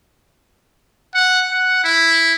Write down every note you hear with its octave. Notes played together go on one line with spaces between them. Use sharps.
F#5
F#5
E4